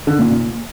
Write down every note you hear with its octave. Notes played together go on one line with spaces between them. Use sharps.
D3
A#2
A#2